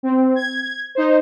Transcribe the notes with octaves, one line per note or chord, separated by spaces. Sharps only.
C4
G#6
D#4 C5